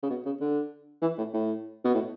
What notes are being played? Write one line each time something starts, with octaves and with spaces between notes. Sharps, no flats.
C#3
B2
C#3
D3
E3
A2
A2
B2
A2